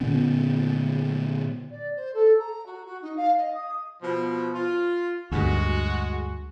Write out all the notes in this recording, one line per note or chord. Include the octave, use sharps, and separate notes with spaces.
A#2 D3 B3 C#4
D5
C5
A4
A#5
F#4
F#4
D#4
F5
D#5
D#6
B2 F3
F4
D2 G2 G#3 F#4